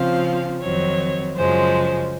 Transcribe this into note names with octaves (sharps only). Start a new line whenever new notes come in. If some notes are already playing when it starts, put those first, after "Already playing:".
Already playing: C#3 F3 C4 F5
F2 D#3 F#3 C4 C#5
F#2 C#3 F3 G#3 C5